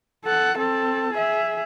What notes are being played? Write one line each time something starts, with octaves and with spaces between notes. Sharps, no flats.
A4 F#5
C4 A4
G#4 E5